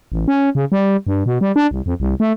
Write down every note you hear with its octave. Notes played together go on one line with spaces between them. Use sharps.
A1
C#4
C#3
G3
G2
B2
G3
D4
C2
F2
C2
A3